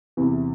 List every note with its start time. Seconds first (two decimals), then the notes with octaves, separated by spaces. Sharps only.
0.17 E2 C3 E3